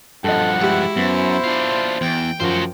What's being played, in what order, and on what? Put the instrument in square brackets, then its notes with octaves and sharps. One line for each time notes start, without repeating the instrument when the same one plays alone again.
[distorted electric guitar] G2 F3 [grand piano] A4 D#5 [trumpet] F#5
[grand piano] G#3 G4 [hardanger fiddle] E4 F#4
[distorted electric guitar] F#2 [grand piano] B3 [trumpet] C5
[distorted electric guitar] D4 F4
[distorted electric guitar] E2 [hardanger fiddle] G5
[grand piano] F#2 F3 [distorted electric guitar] F#4 C5